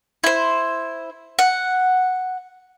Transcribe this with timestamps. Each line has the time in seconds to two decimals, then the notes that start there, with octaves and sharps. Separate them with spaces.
0.24 E4 C5
1.39 F#5